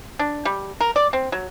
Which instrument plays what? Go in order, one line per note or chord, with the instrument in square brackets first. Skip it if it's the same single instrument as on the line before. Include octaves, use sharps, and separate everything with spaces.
[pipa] D4
G3
A#4
D5
C4
F#3